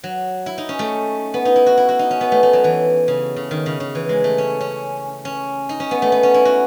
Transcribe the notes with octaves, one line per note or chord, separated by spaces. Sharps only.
F#3
E4
D#4
C#4
A3
B3
D#4
E4
F#4
E4
F#4
D#4
C#4
B3
A3
A3
F#3
E3
C#3
C#3
D#3
C#3
C#3
E3
G#3
A3
C#4
C#4
C#4
D#4
C#4
B3
A3
B3
C#4
E4
F#4